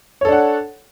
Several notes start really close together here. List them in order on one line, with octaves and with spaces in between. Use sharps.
C#5 A4 D4 F#5